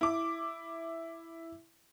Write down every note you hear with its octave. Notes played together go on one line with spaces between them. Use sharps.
E4 D6